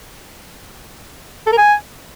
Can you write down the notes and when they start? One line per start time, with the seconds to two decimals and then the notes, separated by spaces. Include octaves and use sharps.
1.46 A4
1.52 A#4
1.58 G#5